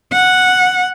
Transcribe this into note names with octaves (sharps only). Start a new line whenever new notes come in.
F#5